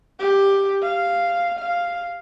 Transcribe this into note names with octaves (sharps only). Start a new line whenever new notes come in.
G4
F5
F5